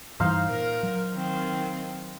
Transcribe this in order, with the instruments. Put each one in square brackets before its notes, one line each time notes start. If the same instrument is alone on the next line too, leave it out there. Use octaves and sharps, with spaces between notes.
[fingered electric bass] G2 E3 G3 [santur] D#4 C5 F5
[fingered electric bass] A#2 [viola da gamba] A#4
[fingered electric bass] F#3
[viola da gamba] D#3 C4